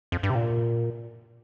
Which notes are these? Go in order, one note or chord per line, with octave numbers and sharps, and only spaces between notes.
F2
G2
C3
A#2